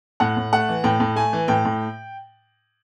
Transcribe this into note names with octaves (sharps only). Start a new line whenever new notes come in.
A2 F#5
A2
A3 F#5
E3
A2 G5
A2
A3 G#5
E3
A2 G5
A2